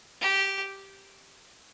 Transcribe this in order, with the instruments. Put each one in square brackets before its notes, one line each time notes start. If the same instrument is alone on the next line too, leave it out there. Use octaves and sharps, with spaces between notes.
[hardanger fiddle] G4